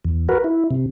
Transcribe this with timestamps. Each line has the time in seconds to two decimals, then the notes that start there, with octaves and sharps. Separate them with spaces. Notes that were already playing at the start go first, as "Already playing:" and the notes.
0.05 E2
0.29 F#4 A#4 B4
0.44 E4
0.71 C3